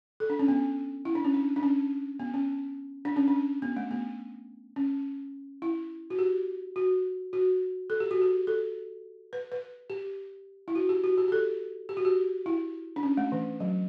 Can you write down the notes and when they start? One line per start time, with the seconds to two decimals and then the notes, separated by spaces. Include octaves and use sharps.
0.20 A4
0.30 D4
0.39 C#4
0.48 B3
1.05 E4
1.15 D4
1.25 C#4
1.34 D4
1.56 D4
1.63 C#4
2.20 B3
2.34 C#4
3.05 D4
3.16 C#4
3.28 D4
3.62 B3
3.77 A3
3.91 B3
4.76 C#4
5.62 E4
6.10 F#4
6.19 G4
6.76 F#4
7.33 F#4
7.90 A4
8.00 G4
8.11 F#4
8.22 G4
8.47 A4
9.33 B4
9.52 B4
9.90 G4
10.68 E4
10.75 F#4
10.89 G4
11.04 F#4
11.18 G4
11.28 G4
11.32 A4
11.89 G4
11.97 F#4
12.05 G4
12.46 E4
12.96 D4
13.03 C#4
13.17 A3
13.32 E3
13.60 F#3